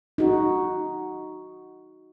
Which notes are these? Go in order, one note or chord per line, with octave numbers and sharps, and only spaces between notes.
D#4 F#4